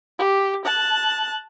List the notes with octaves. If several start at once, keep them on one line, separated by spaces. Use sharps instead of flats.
G4
A5 F#6